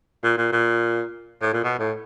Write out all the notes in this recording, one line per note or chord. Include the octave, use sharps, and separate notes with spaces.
A#2
A#2
A#2
A2
A#2
B2
A2